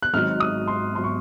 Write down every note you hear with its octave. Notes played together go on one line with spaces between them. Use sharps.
F#6
G#1 G#2 F#3 F6
D#6
C6
F#3 C6
C#6